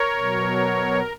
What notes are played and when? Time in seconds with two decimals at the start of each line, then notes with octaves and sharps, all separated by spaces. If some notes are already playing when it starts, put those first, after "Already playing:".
Already playing: A#4 C#5
0.16 B2 F#3